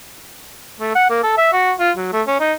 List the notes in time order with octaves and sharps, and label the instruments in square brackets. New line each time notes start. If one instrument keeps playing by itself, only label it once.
[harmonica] A3
F#5
A#3
A4
E5
F#4
F4
F#3
A3
C#4
D#4